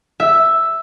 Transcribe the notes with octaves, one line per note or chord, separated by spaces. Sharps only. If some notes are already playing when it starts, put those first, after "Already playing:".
E5